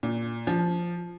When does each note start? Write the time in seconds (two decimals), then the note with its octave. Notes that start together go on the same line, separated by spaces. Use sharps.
0.03 A#2
0.47 F3